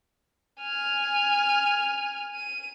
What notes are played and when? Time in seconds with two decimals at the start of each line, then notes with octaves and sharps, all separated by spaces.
0.61 G#5 F6
2.35 D#7